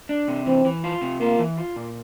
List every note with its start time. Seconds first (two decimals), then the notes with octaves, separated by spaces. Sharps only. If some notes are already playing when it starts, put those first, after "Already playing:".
0.09 D4
0.28 C3
0.46 E3 C4
0.65 E3
0.84 F4
1.01 C3
1.21 A#3 F4
1.39 E3
1.57 F4
1.76 A#2